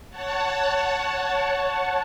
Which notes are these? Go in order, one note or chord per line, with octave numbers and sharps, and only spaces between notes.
C#5 F#5 A5